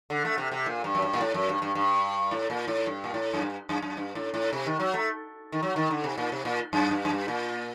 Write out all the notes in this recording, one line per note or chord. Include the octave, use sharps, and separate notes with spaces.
D3
A3
C3
C3
A#2
G2
F#2
G2
A#2
A2
F#2
G2
G2
G2
A2
A#2
A2
G2
A#2
A2
F#2
G2
F#2
F#2
G2
A2
A2
C3
D#3
F#3
A3
D#3
F#3
D#3
D3
C3
A#2
C3
A#2
F#2
G2
F#2
G2
A#2